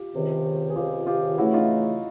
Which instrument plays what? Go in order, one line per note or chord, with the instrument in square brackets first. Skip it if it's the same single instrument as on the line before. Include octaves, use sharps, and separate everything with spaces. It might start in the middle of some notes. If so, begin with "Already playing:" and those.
Already playing: [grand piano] F4 G4
[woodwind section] C#2 C3 D#3
[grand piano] G#4
[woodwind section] C#2 C3 D#3 [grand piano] F4 G4
[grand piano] F4 G4
[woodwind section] C#3 E3 A3 [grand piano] E4 F#4
[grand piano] D#4 F4